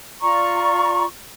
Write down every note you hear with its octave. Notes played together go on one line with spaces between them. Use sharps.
F4 D5 A#5 C#6